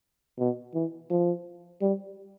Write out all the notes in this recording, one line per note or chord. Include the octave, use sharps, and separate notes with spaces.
B2
E3
F3
G3